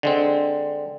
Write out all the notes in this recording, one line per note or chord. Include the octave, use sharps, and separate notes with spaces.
D3 G#3 C4